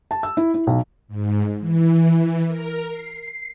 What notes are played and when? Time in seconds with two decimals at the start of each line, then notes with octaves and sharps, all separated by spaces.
0.11 A5
0.23 E6
0.37 E4
0.54 E4
0.67 B1
1.08 G#2
1.60 E3
2.47 A#4
2.90 C7